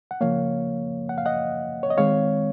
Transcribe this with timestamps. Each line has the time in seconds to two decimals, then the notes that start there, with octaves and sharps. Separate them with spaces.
0.11 F#5
0.21 C#3 F3 A#3 C#5 F5
1.09 F#5
1.18 F5
1.26 D#5 F#5
1.83 C#5
1.90 D#5
1.98 D#3 G#3 C4 C#5 F5